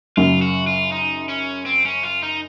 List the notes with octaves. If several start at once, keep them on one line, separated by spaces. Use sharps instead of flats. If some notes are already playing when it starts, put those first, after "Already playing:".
F#2 C#3 F#3 F4
F#4
F4
D#4
C#4
C4
C#4
F4
D#4